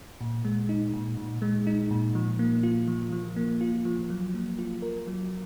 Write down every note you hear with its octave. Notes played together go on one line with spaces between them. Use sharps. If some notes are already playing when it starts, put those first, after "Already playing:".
A#2
G#3
D#4
A#2
A#2
G#3
D#4
A#2
F3
A#3
F4
F3
F3
A#3
F4
F3
F#3
A#3
F4
A#4
F#3